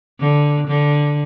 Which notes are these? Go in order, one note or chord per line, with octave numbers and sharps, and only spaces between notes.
D3
D3